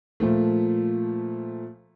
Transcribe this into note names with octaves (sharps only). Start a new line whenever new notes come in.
A#2 F3 A3